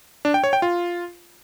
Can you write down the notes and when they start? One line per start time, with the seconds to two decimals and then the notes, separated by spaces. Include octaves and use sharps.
0.25 D4
0.34 G5
0.44 C#5
0.53 G5
0.62 F4